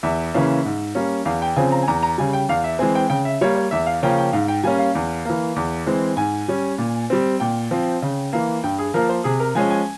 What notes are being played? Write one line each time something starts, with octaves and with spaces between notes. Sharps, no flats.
E2 E5
C#3 E3 A#3 C#4
G#2
G3 A#3 C#4
E2 F5
G5
C#3 F3 C4 G#5
A#5
G#5
E2 A#5
A#5
C#3 G3 G#5
G5
E2 F5
E5
E3 G#3 C4 G#5
G5
C#3 G5
E5
G3 A#3 C#5
C#5
E2 E5
F5
C#3 F3 A#3 C#4 G5
G5
G#2 F5
G5
G3 A#3 C#4 G#5
F5
E2
E3 A#3
E2
E3 G#3 C4
G#2 G#5
G3 C#4
A#2
G3 C4
A#2 G5
F3 C4
C#3
E3 A#3
G2 G5
G#4
F3 A#3 A#4
C5
C3 G#4
A#4
F3 G#3 C#4 G#5
G#5